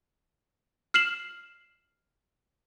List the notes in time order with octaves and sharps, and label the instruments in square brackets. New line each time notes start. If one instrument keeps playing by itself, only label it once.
[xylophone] F6 C7 E7 F#7